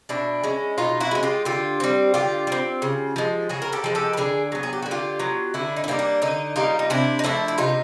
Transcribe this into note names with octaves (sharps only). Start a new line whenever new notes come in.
B2 D4 E4
G#3 C#4
B2 D#4 F4
E4 F#4
G#3 C#4
F4 G4
D3 F4 G4
G3 C4
D3 F4 G4
G3
C4
C#3
F3 G#3
C#3 F#4 G#4
A#4
G4 A4
F3 G#3
G4 A4
B4
D3 G#4 A#4
F#3 B3
G#4
G4
D3 F#4
F4 G4
F#3 B3
D3 D4 E4
D#4
E4
G3 A#3 D#4
D4
D3 D#4
G3 A#3 D#4 F4
D#4
C3 D4 E4
D#4
F3 A3 D4 E4
E4
C3 D#4 F4